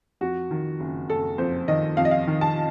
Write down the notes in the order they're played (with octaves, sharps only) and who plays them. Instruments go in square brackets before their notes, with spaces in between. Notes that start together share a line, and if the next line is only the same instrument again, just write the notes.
[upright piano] F2 F#4
D#3
F#1
F#1 A4
F2 C5
D#3 D#5
F2 F5
D#5
F5
D#3
A5